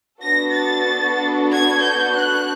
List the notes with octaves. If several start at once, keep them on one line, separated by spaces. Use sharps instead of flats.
B3 D4 F#4 A4 A#6
A6
G#6
G6
F#6